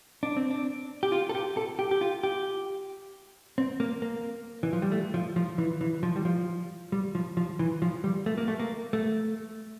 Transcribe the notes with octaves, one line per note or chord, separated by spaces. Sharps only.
D4
C4
D4
G4
F4
A4
G4
A4
G4
G4
F4
G4
C4
A#3
A#3
E3
F3
G3
A3
F3
F3
E3
E3
F3
G3
F3
G3
F3
F3
E3
F3
G3
A3
A#3
A3
A#3
A3